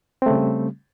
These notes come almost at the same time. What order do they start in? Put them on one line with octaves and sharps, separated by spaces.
C4 A3 C#3 G3